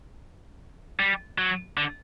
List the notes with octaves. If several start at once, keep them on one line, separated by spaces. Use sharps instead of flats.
G3
F#3
D3